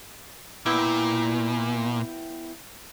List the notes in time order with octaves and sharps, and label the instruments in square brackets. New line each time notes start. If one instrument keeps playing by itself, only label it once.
[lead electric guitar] A#2 [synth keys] B3 E4 G5